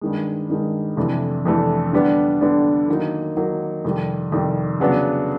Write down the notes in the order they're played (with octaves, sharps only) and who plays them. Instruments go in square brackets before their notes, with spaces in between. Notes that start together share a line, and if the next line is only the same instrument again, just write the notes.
[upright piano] G2 D#3 G#3
G2 D#3 G#3
F2 C3 E3 A3 D4
F2 C3 E3 A3 D4
D3 G3 B3 D4
D3 G3 B3 D4
D#3 F#3 A#3 D#4
D#3 F#3 A#3 D#4
F2 C3 D#3 G3
F2 C3 D#3 G3
C#3 F#3 B3 D4